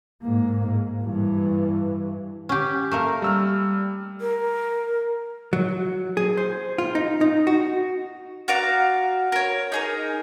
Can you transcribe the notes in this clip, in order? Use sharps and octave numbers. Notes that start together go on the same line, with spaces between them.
G#2 A#3
G#2
G2 E3
C#4 G4
A3 A#3 A#4
G3 E6 F6
A#4
F#3
G#4
C5
F4
D#4
D#4
F#4
F#4 D5 F5 A#5
A#4 C#5
D#4 G#4 A#4